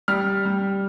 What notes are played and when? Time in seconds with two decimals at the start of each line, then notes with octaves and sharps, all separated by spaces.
0.08 G3 F6
0.45 G3